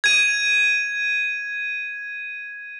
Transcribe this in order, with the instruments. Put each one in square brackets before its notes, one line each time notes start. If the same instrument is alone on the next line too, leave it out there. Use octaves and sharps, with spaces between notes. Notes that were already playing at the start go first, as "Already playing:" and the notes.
[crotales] G#6 D#7